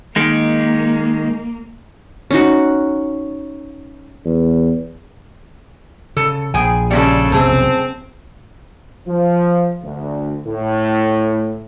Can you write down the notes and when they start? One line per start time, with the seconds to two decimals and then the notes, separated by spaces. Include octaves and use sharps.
0.16 D#3 G#3 A#3
2.31 C#4 D#4 F#4
4.25 E2
6.17 C#3 A4
6.54 A#1 G#4 G5 G#5
6.91 C#3 G3 G#3 A4
7.32 F1 B1 A3 C4 G#4
9.07 F3
9.83 D2
10.46 A2